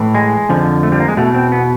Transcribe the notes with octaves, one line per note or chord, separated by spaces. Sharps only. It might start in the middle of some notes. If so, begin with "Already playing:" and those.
Already playing: A2 E3
G#3
F2 D3 F3
A3
G3
A#3
G#3
E2 B2 A3
C4
B3